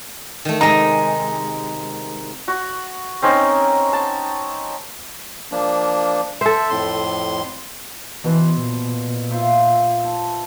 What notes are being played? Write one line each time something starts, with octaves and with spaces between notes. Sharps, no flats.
D#3 A3
C3 G#3 D#4
F#4
C4 C#4 D#4 A#4
A5
F3 A#3 D4
A4 C5 E5
F2 A2 C6
B2 E3 C5
A#2
F4 C5 E5
A5